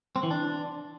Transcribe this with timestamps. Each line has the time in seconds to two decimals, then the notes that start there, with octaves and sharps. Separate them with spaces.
0.16 C4
0.23 E3
0.31 D4